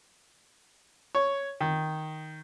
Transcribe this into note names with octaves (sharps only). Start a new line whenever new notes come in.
C#5
D#3